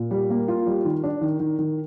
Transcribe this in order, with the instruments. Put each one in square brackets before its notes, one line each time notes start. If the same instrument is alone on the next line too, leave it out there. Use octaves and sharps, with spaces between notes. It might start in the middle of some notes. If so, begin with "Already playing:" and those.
Already playing: [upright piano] A#2
G3
A#3
F4
G3
D#3
D4
D#3
D#3
D#3